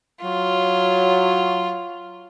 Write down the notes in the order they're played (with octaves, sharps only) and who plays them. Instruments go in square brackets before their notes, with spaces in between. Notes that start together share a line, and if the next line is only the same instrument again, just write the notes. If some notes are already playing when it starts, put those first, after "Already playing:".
[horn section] F#3 [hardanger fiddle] F4